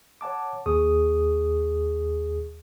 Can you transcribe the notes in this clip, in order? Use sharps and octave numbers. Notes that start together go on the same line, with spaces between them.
C#5 F#5 A5 D6
D#2 G#4 C#6 D#6